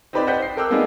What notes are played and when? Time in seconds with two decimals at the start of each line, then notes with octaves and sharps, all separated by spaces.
0.13 C4 D#4 G4 B4 C5 D5
0.27 C5 D#5 F#5 G5 G6 B6
0.42 C7
0.56 A4 A#4 G5 D6 E6 F#6
0.70 G#3 A#3 B3 D4 D#4 G#4